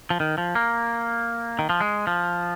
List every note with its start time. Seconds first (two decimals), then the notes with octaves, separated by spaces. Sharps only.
0.10 F3
0.20 D#3
0.38 F3
0.55 A#3
1.59 D#3
1.69 F3
1.81 G#3
2.07 F3